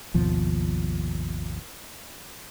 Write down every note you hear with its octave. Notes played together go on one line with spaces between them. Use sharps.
G#1 D#2 B2 F3